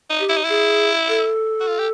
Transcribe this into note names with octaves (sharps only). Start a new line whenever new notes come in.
D#4
G4
E4
D#4
E4 G#4
A4
F#4
F4
G4